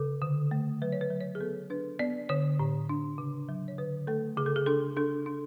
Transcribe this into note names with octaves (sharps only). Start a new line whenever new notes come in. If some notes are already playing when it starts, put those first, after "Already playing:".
Already playing: C#3 A4
D3
A3
F#3 B4
C#5
B4
F#3
C#5
G#4
B3 A4
D4 B4
B3 D5
D3 C#5
A2
D4
C#3
F#3
C#5
D3 B4
A3 A4
C#3 G#4
A4
G#4
D4 A4
D4 A4
D4